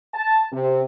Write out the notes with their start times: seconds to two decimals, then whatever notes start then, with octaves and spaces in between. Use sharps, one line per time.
0.13 A5
0.51 C3